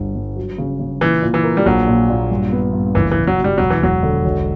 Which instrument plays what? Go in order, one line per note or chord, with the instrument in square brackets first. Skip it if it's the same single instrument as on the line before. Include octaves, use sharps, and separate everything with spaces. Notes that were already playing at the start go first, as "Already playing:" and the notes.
Already playing: [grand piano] G1 G2
G2
F#3
C#3
C#3
[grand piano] A#2 [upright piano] E3
[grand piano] A#2
[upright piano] E3
[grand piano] A#3
[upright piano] G3
[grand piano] A#1 [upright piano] F#3
[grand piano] A#2
A#2
G2
B3
G2
[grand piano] F#1 [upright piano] E3
[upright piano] E3
[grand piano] F#1
[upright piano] F#3
[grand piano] B2
[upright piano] G3
[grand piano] E1 [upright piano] F#3
[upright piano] E3
[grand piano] E1 [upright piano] F#3
[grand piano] D3
B1